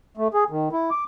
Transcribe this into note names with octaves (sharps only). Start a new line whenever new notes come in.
A3
G#4
D#3
E4
D6